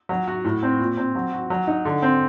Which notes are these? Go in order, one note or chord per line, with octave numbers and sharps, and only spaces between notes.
F#3
F#4
A2
C4
A#2
C4
F#3
F#4
F#3
D#4
D3
C4